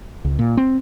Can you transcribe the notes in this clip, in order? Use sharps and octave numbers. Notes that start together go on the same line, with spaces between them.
C#2
A#2
C4